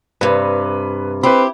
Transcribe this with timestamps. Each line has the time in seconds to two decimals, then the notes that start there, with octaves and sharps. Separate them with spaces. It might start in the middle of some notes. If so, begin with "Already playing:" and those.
0.21 G2 C3 B4
1.23 C4 E4 G4 B4 B5